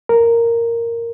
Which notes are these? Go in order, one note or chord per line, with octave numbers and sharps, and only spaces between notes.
A#4